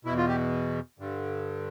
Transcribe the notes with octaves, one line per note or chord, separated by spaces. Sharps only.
E2 B2 E4
F4
G4
G2 D3